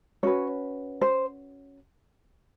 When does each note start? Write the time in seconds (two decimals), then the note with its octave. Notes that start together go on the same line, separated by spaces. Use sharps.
0.23 C#4 F#4 B4 C#5
1.01 C5